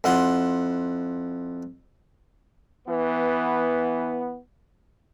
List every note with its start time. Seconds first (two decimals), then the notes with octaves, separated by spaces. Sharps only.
0.04 F2 E4 F#5 C6
2.87 E3 B3